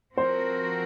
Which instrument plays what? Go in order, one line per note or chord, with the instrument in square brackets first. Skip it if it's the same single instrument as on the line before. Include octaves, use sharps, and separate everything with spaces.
[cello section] F3 C4 F#4 A#4 [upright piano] C5